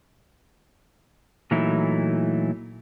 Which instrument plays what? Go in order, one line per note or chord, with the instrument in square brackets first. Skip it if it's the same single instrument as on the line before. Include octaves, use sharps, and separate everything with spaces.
[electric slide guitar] A#2 E3 F#3 A3 D#4 E4